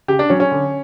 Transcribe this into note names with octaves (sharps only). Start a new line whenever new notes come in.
C#3 G4
D4
F#3 C#4
C#4
D3